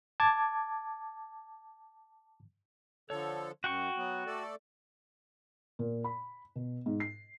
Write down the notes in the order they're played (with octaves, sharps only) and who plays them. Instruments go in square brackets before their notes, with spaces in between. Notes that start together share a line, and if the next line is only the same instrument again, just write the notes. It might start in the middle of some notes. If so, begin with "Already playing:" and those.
[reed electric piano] A5 D6 G#6
[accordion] D3 F3 A4 [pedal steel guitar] C#5
[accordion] F#2 [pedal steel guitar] F#4 G5 C#6
[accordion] F#3 B3
A3 A4 D5
[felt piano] A#2
B5
B2
G#2
C7